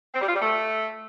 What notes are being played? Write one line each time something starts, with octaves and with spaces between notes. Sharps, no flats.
C4
G3
F4
G3
A3